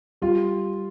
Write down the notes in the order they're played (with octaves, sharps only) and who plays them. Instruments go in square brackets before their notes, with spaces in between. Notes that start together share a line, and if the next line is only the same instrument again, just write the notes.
[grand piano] G3 F4